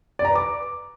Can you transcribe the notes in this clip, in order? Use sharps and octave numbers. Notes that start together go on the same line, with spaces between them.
D5
A#5
B4
D6